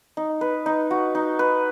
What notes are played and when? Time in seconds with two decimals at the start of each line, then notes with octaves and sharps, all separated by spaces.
0.17 D#4
0.41 B4
0.66 D#4
0.91 F#4
1.15 D#4
1.39 B4